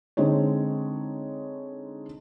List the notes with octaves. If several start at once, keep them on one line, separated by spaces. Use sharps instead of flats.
D3 G#3 C4 D#4 C#5